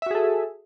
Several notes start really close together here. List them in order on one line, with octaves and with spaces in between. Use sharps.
E5 F#4 G#4 A4